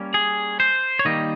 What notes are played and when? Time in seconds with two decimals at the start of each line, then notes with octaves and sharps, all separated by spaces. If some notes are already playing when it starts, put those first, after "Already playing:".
Already playing: G3 A#3 C#4
0.14 G#4
0.60 C5
0.99 C#5
1.05 D#3 G3 A#3 D#5